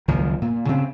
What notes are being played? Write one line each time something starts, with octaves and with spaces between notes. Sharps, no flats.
F#1 C#2 D#3 F3
A#2
C#3 C4